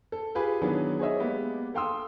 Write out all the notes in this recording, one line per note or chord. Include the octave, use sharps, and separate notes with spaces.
A4
F4 G4 G#4 B4
D#3 E3 F#3 B3 D4 G#4
G#4 C5 C#5 D#5 E5
G#3 A#3 B3 G4
A4 F5 G5 C6 D#6 E6